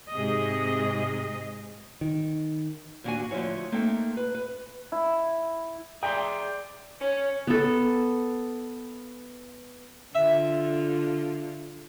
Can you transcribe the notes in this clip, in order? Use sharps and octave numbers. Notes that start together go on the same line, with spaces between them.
G#2 C3 G#4 D#5
D#3
D#2 G3 A#3 D4 F#4 G#5
D2 B2 F3 E4 C#5
A3 A#3 C4 D#4 A4 G5
B4
B4
E4
G#4 D5 E5 G5 A#5 C6
C#4
B3 A4
D3 F4 E5